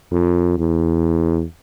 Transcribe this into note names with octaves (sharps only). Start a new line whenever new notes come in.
F2
E2